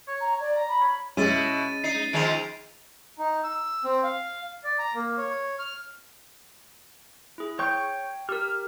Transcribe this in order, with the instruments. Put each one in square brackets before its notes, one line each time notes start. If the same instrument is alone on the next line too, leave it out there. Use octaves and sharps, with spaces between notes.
[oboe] C#5
[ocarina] A#5
D5
[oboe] A#5
[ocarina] B5
[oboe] C#5
[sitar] B2 E4 [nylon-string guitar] G#3 [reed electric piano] C#4 [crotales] A6 D#7
[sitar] D#4 [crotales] C7 D#7
[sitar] D#3 F3 G#3 [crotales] D7 F7
[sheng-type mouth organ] D#4
E6
C4
F5
D5
A#5
A#3
C#5
F6
[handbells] E4 G#4
[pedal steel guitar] C#5 C#6 G6 [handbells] G5
[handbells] G4 A#4 [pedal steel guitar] F6